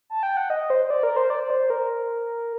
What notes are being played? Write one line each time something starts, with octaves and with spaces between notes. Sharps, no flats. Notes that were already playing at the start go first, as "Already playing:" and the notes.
A5
G5
F#5
D#5
C5
C5
D5
A#4
C5
D5
D5
C5
A#4